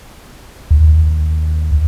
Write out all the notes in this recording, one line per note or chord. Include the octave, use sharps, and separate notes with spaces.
D#2